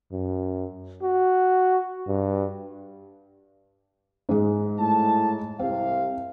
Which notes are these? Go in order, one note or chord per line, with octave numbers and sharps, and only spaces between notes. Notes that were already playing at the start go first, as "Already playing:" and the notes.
F#2
F#4
G2
G#2 G#3
A2 A5
C2 C3 C4 F5